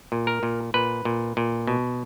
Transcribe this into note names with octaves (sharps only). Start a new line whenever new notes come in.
A#2
A#4
A#2
A#2 B4
A#2
A#2
B2